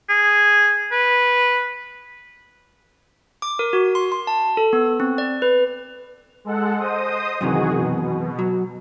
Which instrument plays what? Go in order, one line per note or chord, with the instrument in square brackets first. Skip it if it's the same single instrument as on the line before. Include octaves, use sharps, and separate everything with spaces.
[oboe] G#4
B4
[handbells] D6
A#4
F#4
C6
C6
A5
A4
B3
C4
D5
B4
[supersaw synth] G#3 A4 F#5
C5 D#5 D#6
[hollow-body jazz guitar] F#2 C3 E3 [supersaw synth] D#3 F#4 G#4
[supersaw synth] B2
[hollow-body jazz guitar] F#3